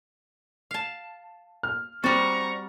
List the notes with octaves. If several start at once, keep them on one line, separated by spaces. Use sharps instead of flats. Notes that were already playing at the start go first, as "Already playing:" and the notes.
F5 A5
F6
G3 C4 F#4 A#5 C#6 A6